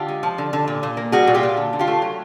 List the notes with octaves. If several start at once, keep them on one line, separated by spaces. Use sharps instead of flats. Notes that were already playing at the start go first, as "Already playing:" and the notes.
Already playing: D3 F4 G4
G#3
F3
D3
D3
A#2
A#2
A#3
G3 F#4 G#4
A#2
F4 G4
A#2
D3
D3
F4 G4
A3
F#3